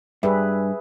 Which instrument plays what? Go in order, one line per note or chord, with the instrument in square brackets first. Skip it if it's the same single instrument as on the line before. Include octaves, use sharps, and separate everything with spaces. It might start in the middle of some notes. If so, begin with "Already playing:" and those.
[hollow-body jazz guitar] G2 [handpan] G#4 B4 E5